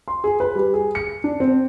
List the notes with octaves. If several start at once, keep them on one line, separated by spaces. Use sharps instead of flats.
C6
G#4
B4
G3
G#4
C#7
D4
C4